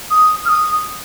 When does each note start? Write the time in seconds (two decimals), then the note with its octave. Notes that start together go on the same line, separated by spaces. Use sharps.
0.10 D#6
0.45 F6
0.49 D#6